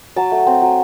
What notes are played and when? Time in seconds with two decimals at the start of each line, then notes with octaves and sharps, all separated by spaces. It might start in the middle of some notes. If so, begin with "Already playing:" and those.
0.16 F#3 A5
0.32 A3
0.47 C4
0.62 F#3